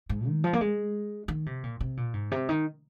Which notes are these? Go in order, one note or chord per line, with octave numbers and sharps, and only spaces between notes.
G#2
D#3
F3
A#3
G#3
D#3
C3
A#2
C3
A#2
G#2
C3
D#3